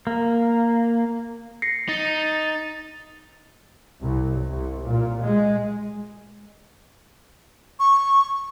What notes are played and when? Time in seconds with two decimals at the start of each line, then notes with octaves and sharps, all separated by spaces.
0.07 A#3
1.62 A#6 C7 C#7
1.88 D#4 A6
4.01 C2
4.50 C2
4.86 A#2
5.21 G#3
7.79 C#6